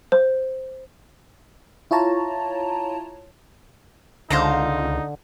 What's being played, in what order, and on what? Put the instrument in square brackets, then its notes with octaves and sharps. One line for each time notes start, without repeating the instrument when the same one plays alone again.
[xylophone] C5
[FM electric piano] E4 F4 C#5 A5 A#5
[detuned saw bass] C#2 [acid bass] D3 [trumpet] D#4 [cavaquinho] C5 F5 A#5